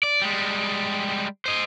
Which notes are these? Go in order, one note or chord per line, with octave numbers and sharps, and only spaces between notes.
D5
G3 G#3
C5 D#5